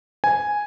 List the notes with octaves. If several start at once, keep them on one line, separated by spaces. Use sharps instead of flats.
G#5